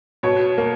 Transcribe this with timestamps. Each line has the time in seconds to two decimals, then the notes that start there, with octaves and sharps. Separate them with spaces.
0.23 B2 C#5
0.58 A#3